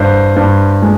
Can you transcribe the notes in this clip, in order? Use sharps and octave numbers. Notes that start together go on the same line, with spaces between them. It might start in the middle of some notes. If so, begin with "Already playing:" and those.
Already playing: G2 C5
G2
G#3